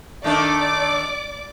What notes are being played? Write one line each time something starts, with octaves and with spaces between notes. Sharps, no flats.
D#3 A3 D4 D5 D6